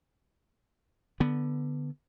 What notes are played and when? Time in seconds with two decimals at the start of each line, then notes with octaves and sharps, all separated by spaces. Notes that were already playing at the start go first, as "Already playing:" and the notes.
1.20 D3 B3